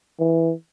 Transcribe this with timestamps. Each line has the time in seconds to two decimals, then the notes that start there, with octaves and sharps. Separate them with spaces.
0.19 E3